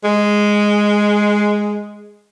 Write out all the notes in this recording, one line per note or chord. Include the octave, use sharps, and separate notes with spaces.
G#3